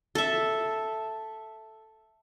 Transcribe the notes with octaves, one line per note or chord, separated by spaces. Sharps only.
A4 E5